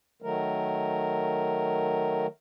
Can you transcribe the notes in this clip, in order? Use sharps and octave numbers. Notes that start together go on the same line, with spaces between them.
D#3 F#3 A3 A#4